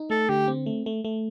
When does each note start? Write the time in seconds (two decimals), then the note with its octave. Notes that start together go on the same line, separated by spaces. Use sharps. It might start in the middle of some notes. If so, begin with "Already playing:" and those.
Already playing: D#4
0.10 A3 A4
0.29 D3 G4
0.48 C4
0.66 A3
0.86 A3
1.05 A3